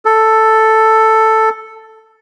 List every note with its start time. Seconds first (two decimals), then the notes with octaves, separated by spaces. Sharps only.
0.05 A4